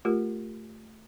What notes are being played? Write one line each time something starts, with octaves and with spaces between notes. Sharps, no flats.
A3 F4 G4 A#4